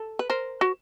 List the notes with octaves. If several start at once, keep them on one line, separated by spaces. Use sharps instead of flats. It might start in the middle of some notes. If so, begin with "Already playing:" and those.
Already playing: A4
B4
A#4 C5
F#4